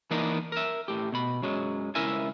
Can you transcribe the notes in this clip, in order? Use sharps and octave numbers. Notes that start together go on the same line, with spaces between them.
E3 A#3 B3 D4 D#4 A#4
A#4 E5
A2 G4
B2 B5
F#2 F#3 G#3
C#2 E4 A#4 E5 G#5